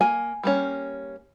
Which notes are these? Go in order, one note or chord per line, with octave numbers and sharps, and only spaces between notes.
A#3 G#5
G3 A#3 C#4